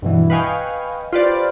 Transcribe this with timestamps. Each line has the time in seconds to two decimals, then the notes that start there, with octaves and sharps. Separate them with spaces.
0.02 G2 B2 E3
0.30 B4 D#5 F5 G5 G#5 C#6
1.13 F4 G4 B4 C5 D5